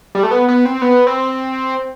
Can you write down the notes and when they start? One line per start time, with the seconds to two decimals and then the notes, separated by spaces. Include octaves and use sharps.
0.15 G3
0.23 A3
0.31 B3
0.48 B3
0.65 C4
0.82 B3
1.07 C4